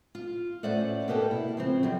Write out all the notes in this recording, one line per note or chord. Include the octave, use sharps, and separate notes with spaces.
F4
A2 C#4 C5 D5 E5 F#5
B2 A#3 B3 G4 A4
E4
C#3 F3 C4
F#2 C3 G3